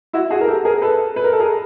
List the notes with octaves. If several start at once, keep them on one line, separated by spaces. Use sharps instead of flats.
E4 F#4
F#4 G#4
A#4
G4 A4
G#4 A#4
A4 B4
B4
A#4
A4
G#4 A#4